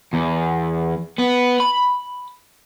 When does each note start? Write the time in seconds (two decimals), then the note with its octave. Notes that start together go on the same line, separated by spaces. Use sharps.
0.13 E2
1.19 B3
1.60 B5